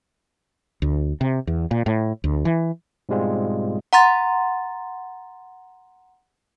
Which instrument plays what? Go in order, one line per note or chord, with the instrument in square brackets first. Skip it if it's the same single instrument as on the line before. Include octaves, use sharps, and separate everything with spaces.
[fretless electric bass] D2
C3
E2
A#2
A2
D2
E3
[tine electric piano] G#2 B2 G3 G#3 C4 F4
[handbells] F#5 A#5 C6 A6